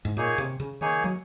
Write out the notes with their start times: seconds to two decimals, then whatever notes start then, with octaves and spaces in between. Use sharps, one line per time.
0.05 G#2
0.17 A#2 A#3 D#4 G#4 C#5 G#5
0.38 C3
0.60 C#3
0.81 D#3 A#3 D#4 G#4 C#5 G#5
1.04 F#3